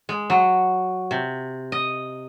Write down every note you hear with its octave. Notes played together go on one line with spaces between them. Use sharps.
G#3
F#3
C3
D#5